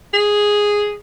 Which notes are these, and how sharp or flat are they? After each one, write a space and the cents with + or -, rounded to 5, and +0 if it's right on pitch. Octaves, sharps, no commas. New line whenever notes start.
G#4 -5